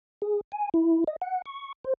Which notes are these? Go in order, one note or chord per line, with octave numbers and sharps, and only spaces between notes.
G#4
G#5
E4
D#5
F#5
C#6
C5